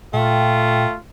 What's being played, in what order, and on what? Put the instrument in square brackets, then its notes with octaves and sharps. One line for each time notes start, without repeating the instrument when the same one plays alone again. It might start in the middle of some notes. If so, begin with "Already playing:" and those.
[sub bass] A#2 [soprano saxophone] A3 [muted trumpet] F4 [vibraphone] G5